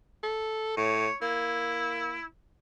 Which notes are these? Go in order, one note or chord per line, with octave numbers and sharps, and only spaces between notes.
A4
A2 C#5
A#3 E4